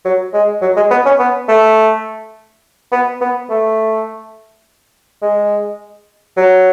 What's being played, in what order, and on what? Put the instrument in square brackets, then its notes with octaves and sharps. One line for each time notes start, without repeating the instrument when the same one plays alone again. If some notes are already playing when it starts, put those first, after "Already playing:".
[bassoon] F#3
G#3
F#3
G#3
B3
C#4
B3
A3
B3
B3
A3
G#3
F#3